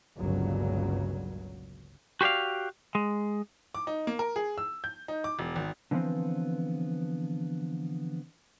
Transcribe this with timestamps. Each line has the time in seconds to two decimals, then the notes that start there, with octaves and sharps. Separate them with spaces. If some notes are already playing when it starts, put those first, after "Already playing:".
0.17 G1 C#2 A#2 C#3 F#3
2.21 F#4 G4 C5 D5 F5
2.95 G#3
3.75 D6
3.87 D#4
4.07 A#3
4.19 A#4
4.36 G#4
4.58 E6
4.84 G6
5.08 D#4
5.24 D6
5.39 E1
5.56 G#1
5.91 D3 E3 F3 B3 C4